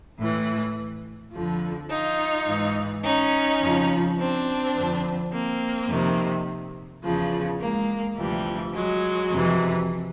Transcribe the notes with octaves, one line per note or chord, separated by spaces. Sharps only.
A2 E3
F2 D3 F3
D#4 F4
G#2 E3
C#4 D#4
F2 C#3 F3
C4 D4
F2 D3 F3
A#3 C4
F2 C3 D#3
E2 C#3 F3
G#3 A#3
D2 C3 E3 F3 G3
F#3 G#3
F2 C3 E3